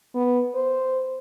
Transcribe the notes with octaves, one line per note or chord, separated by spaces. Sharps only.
B3
C5